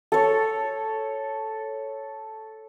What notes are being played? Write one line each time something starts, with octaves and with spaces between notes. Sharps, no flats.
A4 C#5